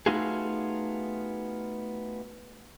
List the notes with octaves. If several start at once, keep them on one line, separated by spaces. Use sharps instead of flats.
A3 B3 D#4 F4 F#4 G#4